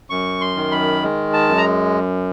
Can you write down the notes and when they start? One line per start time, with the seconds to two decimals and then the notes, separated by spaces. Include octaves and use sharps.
0.10 F#2 C#6
0.41 C6
0.56 D#3
0.71 B5
1.03 G#3
1.33 A5
1.48 F#2
1.57 A#5